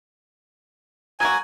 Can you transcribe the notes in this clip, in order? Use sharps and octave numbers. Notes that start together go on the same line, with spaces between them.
F#3 A#3 F#4 G#5